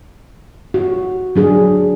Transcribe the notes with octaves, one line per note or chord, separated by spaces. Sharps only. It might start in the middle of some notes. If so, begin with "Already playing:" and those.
F#4
F#3 D4 G#4